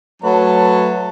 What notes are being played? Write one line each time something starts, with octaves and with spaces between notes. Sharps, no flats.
F#3 A3 B4 C#5 A5